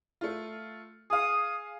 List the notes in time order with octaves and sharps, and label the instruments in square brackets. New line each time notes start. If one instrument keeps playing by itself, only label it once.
[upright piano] A3 F4
[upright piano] G#4 F5 [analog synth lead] D#6